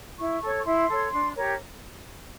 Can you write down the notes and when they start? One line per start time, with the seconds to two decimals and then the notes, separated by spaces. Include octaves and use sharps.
0.17 E4 C#6
0.40 A4 C#5
0.59 C#6
0.64 E4 C6
0.87 A4 C#5
1.11 D4
1.35 G4 A#4 C#5